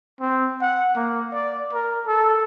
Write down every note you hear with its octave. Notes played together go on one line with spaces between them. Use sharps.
C4
F#5
A#3
D5
A#4
A4